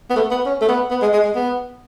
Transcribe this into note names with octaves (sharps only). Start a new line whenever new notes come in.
B3
A3
B3
C#4
A3
B3
B3
G#3
G#3
G#3
B3